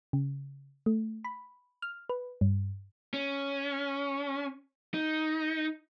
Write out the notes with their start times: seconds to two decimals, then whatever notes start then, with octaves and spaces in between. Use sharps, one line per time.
0.13 C#3
0.86 A3
1.24 B5
1.82 F6
2.09 B4
2.41 G2
3.14 C#4
4.94 D#4